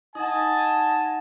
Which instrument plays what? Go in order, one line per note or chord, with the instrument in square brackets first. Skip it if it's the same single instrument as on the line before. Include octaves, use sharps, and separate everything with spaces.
[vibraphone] D#4 F#5 [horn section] D#5 G#5 A5